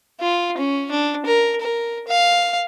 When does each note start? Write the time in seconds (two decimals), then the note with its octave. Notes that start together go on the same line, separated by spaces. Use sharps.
0.21 F4
0.58 C#4
0.91 D4
1.26 A#4
1.61 A#4
2.08 F5